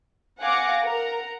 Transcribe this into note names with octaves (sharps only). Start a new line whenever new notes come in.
F5 F#5 G#5 D6 A#6 C#7
A#4 F#5 A#5